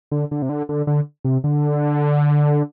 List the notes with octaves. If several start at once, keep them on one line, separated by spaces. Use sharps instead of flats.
D3
D3
C3
D3
D3
D3
C3
D3